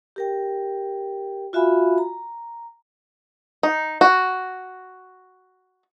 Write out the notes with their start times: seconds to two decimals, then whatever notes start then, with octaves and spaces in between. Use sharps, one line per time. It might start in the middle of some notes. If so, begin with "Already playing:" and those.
0.16 G4 A#4 G5
1.53 F4 F#4 E5 F5 G#5 B5
1.98 A#5
3.63 D#4
4.01 F#4